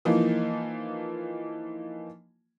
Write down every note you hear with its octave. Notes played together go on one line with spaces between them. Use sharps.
E3 F3 A#3 D#4